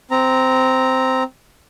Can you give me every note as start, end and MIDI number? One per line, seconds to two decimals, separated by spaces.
0.11 1.23 60
0.11 1.23 82